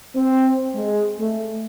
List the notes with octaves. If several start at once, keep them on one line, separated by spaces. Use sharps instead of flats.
C4
G#3
A3